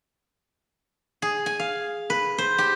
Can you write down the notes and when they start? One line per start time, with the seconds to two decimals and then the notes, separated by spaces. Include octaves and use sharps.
1.22 G#4
1.46 G#5
1.59 F5
2.10 B4
2.38 C5
2.58 G4